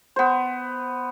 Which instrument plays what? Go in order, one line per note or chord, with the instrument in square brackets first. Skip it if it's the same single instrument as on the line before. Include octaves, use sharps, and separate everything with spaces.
[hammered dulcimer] B3 C5